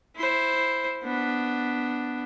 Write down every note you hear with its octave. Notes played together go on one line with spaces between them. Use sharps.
E4 C5
B3 D4